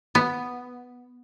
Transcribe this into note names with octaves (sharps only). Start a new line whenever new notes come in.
B3